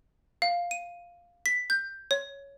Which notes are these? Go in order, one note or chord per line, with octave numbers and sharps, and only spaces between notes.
F5
D#7
B6
G6
C#5